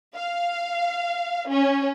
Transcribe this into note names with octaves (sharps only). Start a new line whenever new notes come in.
F5
C#4